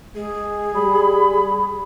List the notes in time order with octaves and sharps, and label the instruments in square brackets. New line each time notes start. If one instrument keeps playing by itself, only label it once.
[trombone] G#3 [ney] G#4
[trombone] G3 [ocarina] B5